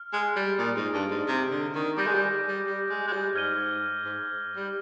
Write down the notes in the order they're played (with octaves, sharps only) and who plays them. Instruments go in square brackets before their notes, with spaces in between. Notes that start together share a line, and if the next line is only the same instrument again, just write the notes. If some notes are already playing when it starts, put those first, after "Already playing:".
Already playing: [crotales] F6
[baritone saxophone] G#3
G3
[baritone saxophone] A#2 [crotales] D#6 G#6 D7
[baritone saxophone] G#2
G2
G#2
C3
D3
D#3
[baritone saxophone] G3 [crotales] D6 G6 A#6 D#7
[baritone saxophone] G#3
G3
G3
G3
G#3
G#3
G3
[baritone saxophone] G#2 [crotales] F6 G#6 D#7 G7
[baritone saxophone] G#2
G3